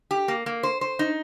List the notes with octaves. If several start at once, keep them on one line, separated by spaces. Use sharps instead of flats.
G4
A#3
A#3
C5
C5
D#4